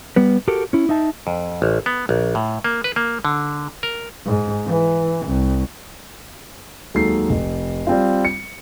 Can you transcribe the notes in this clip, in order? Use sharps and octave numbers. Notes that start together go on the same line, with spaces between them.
G3 B3 B4
F#4 G4 A4 A#4
C#4 E4
D#4 E5 A5
F2
A1
B3
A#1
A2
A#3
B4
A#3
D3
A#4
G#2
E3
C2
D#2 F#3 G#3 D#4 A4 C7
F1
G3 C4 F4
C#7